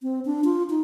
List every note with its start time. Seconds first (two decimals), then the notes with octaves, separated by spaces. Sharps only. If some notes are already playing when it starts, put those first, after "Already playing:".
0.03 C4
0.25 D4
0.45 F4
0.70 D#4